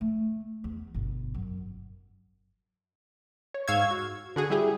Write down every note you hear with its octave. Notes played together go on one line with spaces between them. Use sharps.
A3
E2
G1 B2
F#2
C#5
G#2 F5 C#6 E6 G#6
F#4
D3 F#4 G#4
G3 E4 G4 G#4